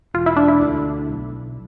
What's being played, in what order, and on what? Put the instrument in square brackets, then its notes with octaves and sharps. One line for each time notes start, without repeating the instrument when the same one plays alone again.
[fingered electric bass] E1 [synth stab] F4
[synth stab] E4
D4
E4
[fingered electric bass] D2 D3
B1